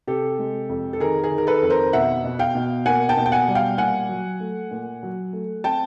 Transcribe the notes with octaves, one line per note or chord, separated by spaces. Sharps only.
C3 G4 A4
G#3
F2
A4
D#3 G#4 A#4
G#4 A#4
D#3
A#4
A4 B4
F2
A#4 C5
B2 E5 F#5
B2
F5 G5
B2
A#3 F#5 G#5
G5 A5
B2
G5
F#5 G#5
G3
F5 G5
A#2 F#5 G#5
F#3
A3
A#2
F#3
A3
C4 G5 A5